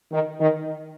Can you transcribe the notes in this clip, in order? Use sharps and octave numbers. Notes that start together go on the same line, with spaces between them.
D#3
D#3